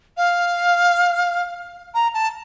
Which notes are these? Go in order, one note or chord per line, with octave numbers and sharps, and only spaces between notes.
F5
A#5
A5